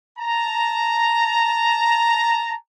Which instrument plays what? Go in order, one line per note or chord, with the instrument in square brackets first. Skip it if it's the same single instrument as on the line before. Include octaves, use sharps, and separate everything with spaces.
[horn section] A5 A#5